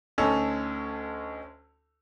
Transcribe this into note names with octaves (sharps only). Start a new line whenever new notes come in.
D2 C#4 D#4 A4 E6 F7